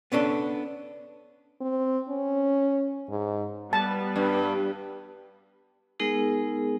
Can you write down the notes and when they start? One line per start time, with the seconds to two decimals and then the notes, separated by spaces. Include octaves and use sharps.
0.12 B3 C#4 D4 A4
1.61 C4
2.09 C#4
3.10 G#2
3.73 G3 B3 B4 A5
4.16 G2
5.99 G#3 B3 D#4 G#4 A#4